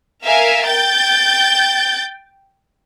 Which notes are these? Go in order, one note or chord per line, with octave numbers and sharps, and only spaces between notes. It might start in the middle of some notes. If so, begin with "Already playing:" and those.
A#4 E5 F5 G#5
G5 G6 A6